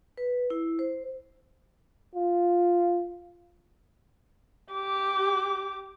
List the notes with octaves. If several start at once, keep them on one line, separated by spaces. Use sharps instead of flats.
B4
E4
C5
F4
G4 D6